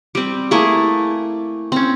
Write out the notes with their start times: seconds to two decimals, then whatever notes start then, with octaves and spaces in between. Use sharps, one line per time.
0.15 G3 C4
0.51 A3 A#3 E4 G#4
1.72 C4 C#4